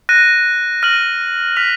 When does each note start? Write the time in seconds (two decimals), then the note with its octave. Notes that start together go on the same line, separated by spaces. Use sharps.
0.09 F#6 A#6 D#7
0.83 F6 A#6 D#7 F#7
1.56 F6 B6 F7